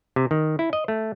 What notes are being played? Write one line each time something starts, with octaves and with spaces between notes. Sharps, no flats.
C3
D#3
E4
D#5
A3